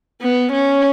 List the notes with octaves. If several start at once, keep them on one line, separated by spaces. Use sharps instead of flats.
B3
C#4